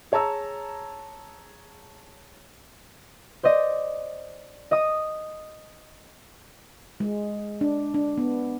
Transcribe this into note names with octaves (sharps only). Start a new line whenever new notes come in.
G#4 C#5 A5 A#5 E6
C5 D5 D#5
D#5 D#6
G#3
D4
D4
B3